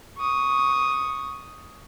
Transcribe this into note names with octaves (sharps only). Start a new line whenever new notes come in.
C#6 D#6